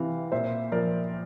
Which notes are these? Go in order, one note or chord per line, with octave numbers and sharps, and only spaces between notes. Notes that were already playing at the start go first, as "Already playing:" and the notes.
Already playing: C3 E3 F5
A#2 C5 E5
F3 A#4 D5